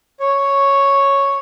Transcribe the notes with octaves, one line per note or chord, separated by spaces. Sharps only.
C#5